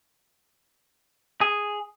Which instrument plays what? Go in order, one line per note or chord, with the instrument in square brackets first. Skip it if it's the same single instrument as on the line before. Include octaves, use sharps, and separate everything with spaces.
[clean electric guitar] G#4